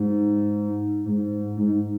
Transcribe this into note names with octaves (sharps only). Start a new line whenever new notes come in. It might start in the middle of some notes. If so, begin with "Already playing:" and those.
Already playing: G#2
G#2
G#2